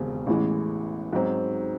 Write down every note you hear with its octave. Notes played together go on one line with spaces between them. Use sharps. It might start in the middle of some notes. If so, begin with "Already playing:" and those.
Already playing: E1 D#2 C#3 C4
A1 A2 E3 G#3
G#2 F#3 C4